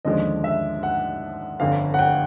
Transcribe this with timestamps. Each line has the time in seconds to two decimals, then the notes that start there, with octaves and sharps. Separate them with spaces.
0.05 D#2 D3 F3 G#3 C#4 D#5
0.44 E5
0.83 F#5
1.60 G1 F2 D3 F5
1.94 F#5
1.99 G5